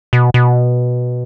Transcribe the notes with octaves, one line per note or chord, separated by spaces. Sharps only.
B2
B2